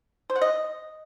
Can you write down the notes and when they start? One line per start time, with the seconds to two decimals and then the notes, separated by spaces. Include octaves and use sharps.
0.30 C5
0.36 F#5
0.42 D#5